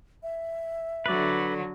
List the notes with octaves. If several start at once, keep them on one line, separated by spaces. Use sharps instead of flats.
E5
D3 F#3 B4 D5